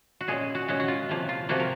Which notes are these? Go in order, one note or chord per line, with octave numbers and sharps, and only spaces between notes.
F#4
A#2 G#3 C#4 G#4
F#4
A#2 G#3 C#4 F#4
F#4
F4
C3 F3 A#3
F4
C3 F3 A#3 F#4
A#4